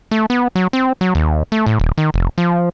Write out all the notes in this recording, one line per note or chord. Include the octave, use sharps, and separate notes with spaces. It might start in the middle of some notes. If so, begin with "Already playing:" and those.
A3
B3
F#3
C4
F#3
D#2
A3
A2
D#1
D#3
F1
F3